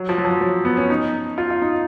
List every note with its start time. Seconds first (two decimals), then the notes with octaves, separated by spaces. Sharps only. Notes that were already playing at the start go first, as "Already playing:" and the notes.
Already playing: F#3
0.09 F3
0.18 F#3
0.25 F3
0.41 F#3
0.65 B3
0.77 C#4
0.90 D#4
1.38 F4
1.51 F4
1.62 D#4